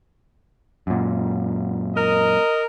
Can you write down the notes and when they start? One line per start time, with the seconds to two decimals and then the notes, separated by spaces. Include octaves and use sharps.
0.87 F#2 A#2
1.96 A#4 D#5